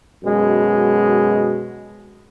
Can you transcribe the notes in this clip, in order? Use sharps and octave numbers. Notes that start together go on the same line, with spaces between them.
F#2 B2 G#3